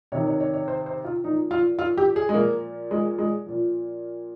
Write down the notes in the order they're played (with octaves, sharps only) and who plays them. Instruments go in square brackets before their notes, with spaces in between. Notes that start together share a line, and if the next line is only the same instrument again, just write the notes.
[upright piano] C3 D#3 C#5
C#5
C#5
C#5
C5
C5
F4
A#2 F3 D#4
F4
F4
G4
G#4
G#3
A#2 F3 A#3
G#3
G#3
A#2 F3